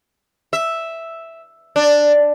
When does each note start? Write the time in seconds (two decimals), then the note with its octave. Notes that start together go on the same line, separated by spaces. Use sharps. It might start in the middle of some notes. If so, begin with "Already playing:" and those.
0.53 E5
1.76 D4